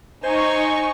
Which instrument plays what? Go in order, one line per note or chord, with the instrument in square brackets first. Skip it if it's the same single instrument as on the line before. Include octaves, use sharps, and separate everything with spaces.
[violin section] D#4 C#6 [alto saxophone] C5 [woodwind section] G#5